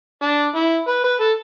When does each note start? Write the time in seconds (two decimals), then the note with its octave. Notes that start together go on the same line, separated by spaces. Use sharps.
0.22 D4
0.55 E4
0.88 B4
1.04 B4
1.21 A4